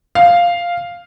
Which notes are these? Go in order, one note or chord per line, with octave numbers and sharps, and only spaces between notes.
F5